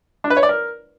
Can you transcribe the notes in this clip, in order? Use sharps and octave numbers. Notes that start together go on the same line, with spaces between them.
D4
B4
C#5
D5
A#4